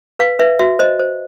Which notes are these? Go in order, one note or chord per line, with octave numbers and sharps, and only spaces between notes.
B4 F5
B4 E5
F#4 E5
C5 D#5
C5